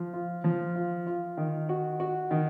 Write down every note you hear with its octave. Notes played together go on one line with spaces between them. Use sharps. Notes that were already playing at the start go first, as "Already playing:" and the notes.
Already playing: F3
F4
F3
F4
F4
D#3
F#4
F#4
D#3